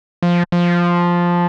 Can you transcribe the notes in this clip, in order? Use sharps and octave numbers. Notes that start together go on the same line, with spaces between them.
F3
F3